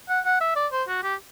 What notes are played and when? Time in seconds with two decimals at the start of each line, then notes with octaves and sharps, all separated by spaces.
0.09 F#5
0.25 F#5
0.41 E5
0.56 D5
0.72 C5
0.88 F#4
1.03 G4